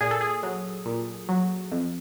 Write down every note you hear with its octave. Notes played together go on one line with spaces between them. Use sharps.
A#2 G#4
A4
G#4
F#3
A#2
F#3
F2